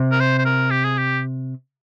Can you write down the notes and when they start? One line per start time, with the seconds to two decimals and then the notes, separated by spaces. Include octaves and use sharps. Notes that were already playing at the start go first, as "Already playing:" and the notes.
Already playing: C3
0.12 A#4
0.21 C5
0.39 C5
0.45 A#4
0.71 G4
0.85 G#4
0.98 G4